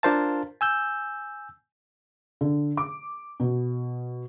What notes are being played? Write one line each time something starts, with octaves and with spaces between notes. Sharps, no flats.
D4 F4 A#4 C5 F5 A5
G#5 E6 G6
D3
D6
B2